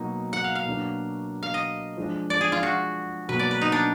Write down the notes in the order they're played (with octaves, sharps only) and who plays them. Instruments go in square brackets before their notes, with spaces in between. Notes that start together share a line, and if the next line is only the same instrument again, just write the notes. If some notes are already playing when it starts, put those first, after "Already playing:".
Already playing: [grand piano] B2 F#3 A#3 D#4
[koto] F#5
F5
F5
[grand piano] B2 F#3 A#3 D4
[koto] F5
D#5
[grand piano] F3 G#3 D4
[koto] D5
G#4
F4
F#4
[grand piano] B2 F#3 A#3 [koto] B4
[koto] D5
B4
D#4
D4